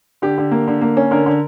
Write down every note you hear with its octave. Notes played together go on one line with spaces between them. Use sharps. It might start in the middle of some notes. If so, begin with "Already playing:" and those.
D3 G4
D3
A#3
D3
A#3
C#4
D3 A#4
D3